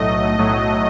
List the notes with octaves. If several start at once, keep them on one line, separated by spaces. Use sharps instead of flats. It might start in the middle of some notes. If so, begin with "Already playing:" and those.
Already playing: B1 A2 F#3 A3 D#5
B1 A2 F#3 A3